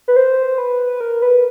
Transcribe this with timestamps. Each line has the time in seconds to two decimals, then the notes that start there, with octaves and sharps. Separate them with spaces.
0.08 B4
0.16 C5
0.58 B4
1.01 A#4
1.22 B4